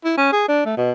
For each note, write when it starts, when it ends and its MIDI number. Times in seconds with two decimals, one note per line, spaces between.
0.04 0.14 64
0.18 0.32 61
0.32 0.46 68
0.48 0.64 62
0.65 0.77 57
0.77 0.92 47